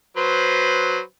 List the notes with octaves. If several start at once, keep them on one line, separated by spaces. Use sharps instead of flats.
F#3 B4 C5